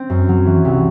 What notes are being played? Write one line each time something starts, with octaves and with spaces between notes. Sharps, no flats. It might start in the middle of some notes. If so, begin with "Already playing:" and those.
Already playing: C4
F#2
F#3
E3
C2